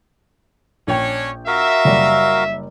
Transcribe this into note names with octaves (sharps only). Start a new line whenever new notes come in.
A#1 C#4 D4 C#5 G5
F#4 A#4 E5 F5
F#1 G3 D5